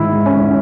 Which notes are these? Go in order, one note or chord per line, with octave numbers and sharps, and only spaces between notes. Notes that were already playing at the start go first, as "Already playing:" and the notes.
Already playing: G#2 D#3 E4
G#2
C#4
D#3
C#4